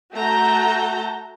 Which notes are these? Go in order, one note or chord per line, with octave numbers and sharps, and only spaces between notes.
A3 F#4 A4 A#5 G6